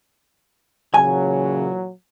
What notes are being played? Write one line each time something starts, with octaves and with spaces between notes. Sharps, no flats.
A#2 C#3 E3 F#3 G#5